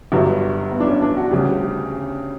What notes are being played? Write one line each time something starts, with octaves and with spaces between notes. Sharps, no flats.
G1 G2 F#3
B3
D4
C#4
D4
F#4
D2 C#3 G3 G4